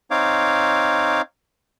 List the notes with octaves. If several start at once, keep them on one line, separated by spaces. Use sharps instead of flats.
C4 D#4 C#5 F5 D6